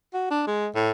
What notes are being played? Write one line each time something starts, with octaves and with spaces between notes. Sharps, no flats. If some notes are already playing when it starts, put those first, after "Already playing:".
F#4
D4
G#3
A2